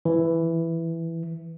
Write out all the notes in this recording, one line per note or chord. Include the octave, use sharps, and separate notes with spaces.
E3